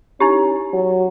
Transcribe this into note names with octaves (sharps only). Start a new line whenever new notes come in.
C#4 D#4 E4 G4
F#3